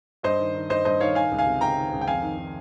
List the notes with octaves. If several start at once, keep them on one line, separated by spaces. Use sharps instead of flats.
G2 C5 D#5
D#3
D#3
G2 C5 D#5
G2 C5 D#5
D#3 C#5 F5
D#3 F5 G#5
C#2
F5 G#5
C3
C#2 G5 A#5
D#3
C#2
G5
F2 F5 G#5
D#3
D#3